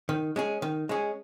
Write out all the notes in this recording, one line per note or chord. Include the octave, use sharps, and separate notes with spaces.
D#3
G#3 C#4 G#4
D#3
G#3 C#4 G#4